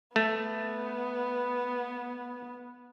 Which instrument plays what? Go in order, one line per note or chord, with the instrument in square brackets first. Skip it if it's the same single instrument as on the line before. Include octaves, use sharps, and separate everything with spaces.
[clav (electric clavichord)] A3 [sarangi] B3